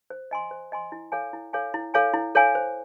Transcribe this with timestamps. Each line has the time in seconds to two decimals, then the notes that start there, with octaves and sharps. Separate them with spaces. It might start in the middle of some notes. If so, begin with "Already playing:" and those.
0.10 C5
0.31 D#5 G#5 C6
0.51 C5
0.72 D#5 G#5 C6
0.92 E4
1.12 A4 C#5 F5 G#5
1.33 E4
1.53 A4 C#5 F5 G#5
1.74 E4
1.94 A4 C#5 F5 G#5
2.14 E4
2.35 A4 C#5 F5 G#5
2.55 C5